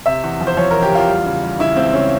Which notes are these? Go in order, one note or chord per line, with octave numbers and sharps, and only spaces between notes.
C3 E5
E2
F3
C5
F3 C#5
E2 A#4
G4
E2 F4
G3
C#3
G3
C#3 E4
C#2 C4
C#3 C#4